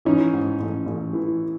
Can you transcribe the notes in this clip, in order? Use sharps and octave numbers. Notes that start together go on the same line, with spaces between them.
E3 C#4 D#4
G#2
A1
A1
E3